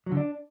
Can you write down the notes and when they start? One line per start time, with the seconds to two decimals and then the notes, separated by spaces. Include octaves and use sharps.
0.06 F#3
0.12 D3
0.17 D4